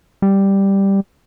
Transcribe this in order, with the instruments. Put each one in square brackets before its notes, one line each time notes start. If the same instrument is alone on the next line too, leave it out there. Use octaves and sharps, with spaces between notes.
[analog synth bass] G3